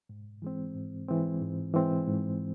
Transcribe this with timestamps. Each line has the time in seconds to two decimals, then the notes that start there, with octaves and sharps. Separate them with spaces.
0.09 G#2
0.42 E3 G#3 C4
0.75 G#2
1.09 E3 G#3 C4
1.41 G#2
1.74 E3 G#3 C4
2.07 G#2